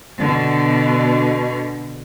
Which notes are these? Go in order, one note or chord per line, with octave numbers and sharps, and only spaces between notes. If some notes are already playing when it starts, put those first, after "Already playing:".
B2 D3